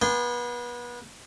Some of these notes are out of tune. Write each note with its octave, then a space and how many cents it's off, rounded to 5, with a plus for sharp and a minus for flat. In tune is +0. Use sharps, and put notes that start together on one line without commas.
B3 -30 G#5 -45 C6 -30